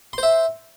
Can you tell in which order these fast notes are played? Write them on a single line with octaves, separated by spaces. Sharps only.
C6 C5 E5